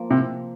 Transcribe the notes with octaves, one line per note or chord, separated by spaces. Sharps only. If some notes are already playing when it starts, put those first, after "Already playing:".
Already playing: F3 A#3 F4
C3